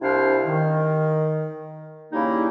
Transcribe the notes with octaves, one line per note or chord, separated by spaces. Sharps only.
C2 C3 D4 E4 C5 F5
D#3
C#3 G3 A#3 D#4 E4